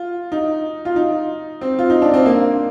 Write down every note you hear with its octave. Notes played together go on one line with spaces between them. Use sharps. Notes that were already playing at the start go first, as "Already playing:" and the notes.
Already playing: F4
D#4
F4
D#4
C4
F4
D#4
D4
C4
A#3